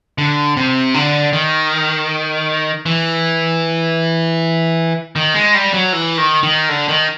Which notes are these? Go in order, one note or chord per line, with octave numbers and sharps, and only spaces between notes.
D3
C3
D3
D#3
E3
D#3
G#3
G3
F#3
E3
D#3
D#3
D3
D#3